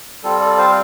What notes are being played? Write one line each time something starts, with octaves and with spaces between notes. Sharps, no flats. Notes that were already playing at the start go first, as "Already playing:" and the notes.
G3 C4 F4 A4
A4 D5
C5 F5